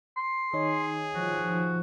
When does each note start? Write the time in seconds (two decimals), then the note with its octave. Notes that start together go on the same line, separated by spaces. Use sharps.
0.17 C6
0.53 D#3 D#4 G#4 C#5
1.15 F3 F#4